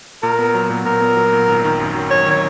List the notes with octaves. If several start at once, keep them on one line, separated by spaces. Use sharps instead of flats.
A#2 A#4
B3
F#3
A#2
A#2 A#4
B3
F#3
A#2
G#1
D#3
F#2
F#3
G#1 C#5
D#3 C#5